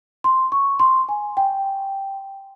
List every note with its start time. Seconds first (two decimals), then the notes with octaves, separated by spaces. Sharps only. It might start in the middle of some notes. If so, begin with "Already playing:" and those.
0.24 C6
0.52 C#6
0.79 C6
1.09 G#5
1.37 G5